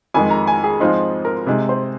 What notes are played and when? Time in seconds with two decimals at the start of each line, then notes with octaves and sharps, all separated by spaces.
0.14 F2 D#3 G#3 G#5
0.31 A#5
0.47 G#5
0.64 G#4
0.80 G#2 F3 G#3 C4 D#4 F4
1.25 A#4
1.47 C3 G#3 D#4
1.69 C5